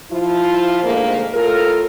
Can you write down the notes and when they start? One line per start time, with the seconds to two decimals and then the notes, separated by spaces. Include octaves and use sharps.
0.11 F3 E4 F4
0.83 F2 G#2 D3 A3 A#3
1.34 A2 F4 A4 A#4